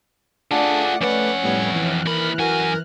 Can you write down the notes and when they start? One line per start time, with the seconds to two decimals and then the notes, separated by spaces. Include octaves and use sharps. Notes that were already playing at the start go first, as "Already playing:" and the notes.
0.51 A3 D4 F4 G#4 D5 F#5
1.01 F2 C#4 B4 F#5
1.42 A2 G3 B3 C#5
1.73 E3 F6 F#6
2.06 D#2 A#4 B5
2.39 F#2 F#4 A#4 G#5